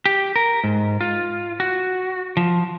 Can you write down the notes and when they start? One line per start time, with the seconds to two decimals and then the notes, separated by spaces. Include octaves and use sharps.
0.05 G4
0.36 A#4
0.64 G#2
1.01 F4
1.60 F#4
2.37 F3